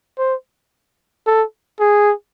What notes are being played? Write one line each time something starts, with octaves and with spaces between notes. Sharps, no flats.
C5
A4
G#4